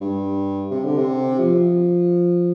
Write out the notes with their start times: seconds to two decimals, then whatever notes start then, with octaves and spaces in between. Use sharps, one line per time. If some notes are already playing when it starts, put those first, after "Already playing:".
0.01 G2
0.71 C3
0.84 D3
0.98 C3
1.39 F3